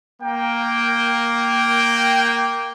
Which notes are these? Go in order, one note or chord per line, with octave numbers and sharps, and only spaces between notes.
A#3 G5